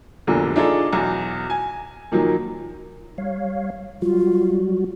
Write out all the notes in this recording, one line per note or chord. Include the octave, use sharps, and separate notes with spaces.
F1 B1 E2 A#2 D3 F3
D4 D#4 F4 G#4 A4
B1 E2
G#5
A#2 D#3 F3 F#3
G3 C#5 F5
F#3 G3 F4 F#4